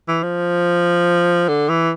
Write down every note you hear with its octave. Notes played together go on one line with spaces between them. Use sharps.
E3
F3
D3
E3